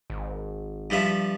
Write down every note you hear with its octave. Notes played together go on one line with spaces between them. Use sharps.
G#1
G2 F3 E5